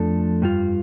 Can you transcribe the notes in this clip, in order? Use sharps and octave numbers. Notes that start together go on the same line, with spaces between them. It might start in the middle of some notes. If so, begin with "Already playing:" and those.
Already playing: F2 F3 A3 D4 A4
G2 G3 F4